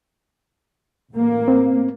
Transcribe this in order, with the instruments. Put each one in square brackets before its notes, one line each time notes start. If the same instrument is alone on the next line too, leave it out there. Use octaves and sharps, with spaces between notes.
[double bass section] A1 A#3
[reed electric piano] C4